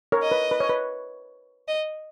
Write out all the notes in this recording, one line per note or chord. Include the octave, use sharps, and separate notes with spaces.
A#4 C#5
D#5
B4
B4
C#5
B4
D#5